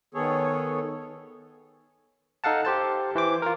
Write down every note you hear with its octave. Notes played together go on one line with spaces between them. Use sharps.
D#3 B3 G#4 A4 C#5
D#4 A4 F5 F#5 A5
G4 C5 A5
E3 C5 D6
F4 A#4